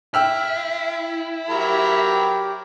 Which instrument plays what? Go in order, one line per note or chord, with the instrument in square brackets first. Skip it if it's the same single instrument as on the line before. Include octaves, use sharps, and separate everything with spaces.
[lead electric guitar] E4 [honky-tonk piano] G5 E6 F6
[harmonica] F#3 A#4 B5 [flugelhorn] G4